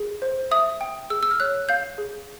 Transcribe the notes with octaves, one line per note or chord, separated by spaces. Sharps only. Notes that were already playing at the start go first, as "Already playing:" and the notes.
Already playing: G#4
C5
E5 D#6
G5
G#4 E6
E6
F6
C#5 F#6
F5 G6
G#4